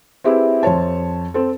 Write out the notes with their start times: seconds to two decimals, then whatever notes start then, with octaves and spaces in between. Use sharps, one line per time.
0.24 C4 E4 G4 G#4 B4
0.63 F2 C5 C#5 A5
1.34 C4 A4